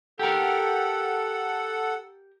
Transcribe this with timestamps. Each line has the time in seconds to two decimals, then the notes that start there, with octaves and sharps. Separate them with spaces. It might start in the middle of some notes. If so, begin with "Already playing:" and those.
0.19 G4 A4 A#4 F#5